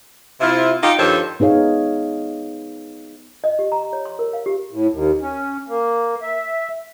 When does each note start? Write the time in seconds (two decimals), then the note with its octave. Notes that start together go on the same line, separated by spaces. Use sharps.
0.41 C3 E4 F4
0.83 D#4 F4 G4
0.99 G2 D#3 F3 A4 C5 C#5
1.40 B3 D#4 G#4 C#5 F5
3.44 D#5
3.59 G4
3.72 A#5
3.93 C#5
4.05 C6
4.19 A#4
4.33 F5
4.46 G4
4.71 A2
4.93 D#2
5.22 C#4
5.68 A#3
6.22 E5